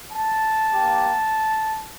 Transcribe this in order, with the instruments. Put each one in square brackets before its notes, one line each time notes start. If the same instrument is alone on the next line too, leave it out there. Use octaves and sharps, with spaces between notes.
[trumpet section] A5
A#3 D4 G4